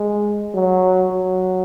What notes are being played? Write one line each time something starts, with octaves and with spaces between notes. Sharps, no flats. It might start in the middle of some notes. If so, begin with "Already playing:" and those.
Already playing: G#3
F#3
F#3